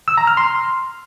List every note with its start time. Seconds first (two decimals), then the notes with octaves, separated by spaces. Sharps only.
0.08 E6
0.18 A#5
0.27 F6
0.37 C6